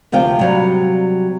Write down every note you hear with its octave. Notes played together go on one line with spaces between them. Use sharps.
D2 C3 F3 F5 G5
C3 F#3 G3